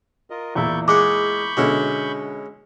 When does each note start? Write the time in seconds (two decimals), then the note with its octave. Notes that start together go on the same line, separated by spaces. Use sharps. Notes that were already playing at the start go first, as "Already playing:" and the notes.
0.30 F4 A#4 D#5
0.55 E2 A#2 E4 D5 C#6 G6
0.88 G#3 G#4 F#5 B5 C#6 D6 G6
1.57 B2 D3 G#3 C#4 E4